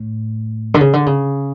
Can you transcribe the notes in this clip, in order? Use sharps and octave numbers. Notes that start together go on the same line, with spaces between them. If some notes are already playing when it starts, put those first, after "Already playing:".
Already playing: A2
D3
C#3
D3
C#3